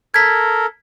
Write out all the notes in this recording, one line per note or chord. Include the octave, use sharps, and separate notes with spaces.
A4 A#4 G#6 B6